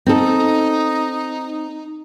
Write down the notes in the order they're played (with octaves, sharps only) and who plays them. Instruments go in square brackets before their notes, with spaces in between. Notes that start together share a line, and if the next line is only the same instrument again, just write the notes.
[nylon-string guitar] C4 A4 [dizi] D#4